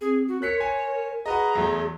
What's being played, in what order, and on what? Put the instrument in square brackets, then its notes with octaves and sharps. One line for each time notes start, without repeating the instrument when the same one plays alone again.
[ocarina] C4 [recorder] G#4
[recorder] F#4
[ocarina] A#4 [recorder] C#5 [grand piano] F#6 B6 C#7
[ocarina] A#4 [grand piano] G#5 C6
[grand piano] F#4 B4 D#5 [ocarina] G#4 [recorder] A#5
[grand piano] E2 F#3 A3